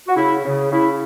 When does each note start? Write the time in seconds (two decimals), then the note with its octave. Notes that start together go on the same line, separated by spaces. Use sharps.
0.08 F#4
0.17 C#3 E4
0.45 C#3
0.72 C#3 E4